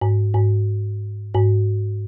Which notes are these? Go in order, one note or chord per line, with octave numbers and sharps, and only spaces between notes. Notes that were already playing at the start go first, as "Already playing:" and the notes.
G#2
G#2
G#2